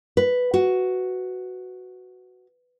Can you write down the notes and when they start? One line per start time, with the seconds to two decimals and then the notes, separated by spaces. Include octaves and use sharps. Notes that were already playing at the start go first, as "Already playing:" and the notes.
0.17 B4
0.54 F#4